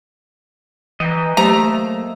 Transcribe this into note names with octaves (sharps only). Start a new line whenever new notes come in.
E3 D#5 G5 A#5
F#3 A3 A#3 G4 C5 D#5 E5 A#5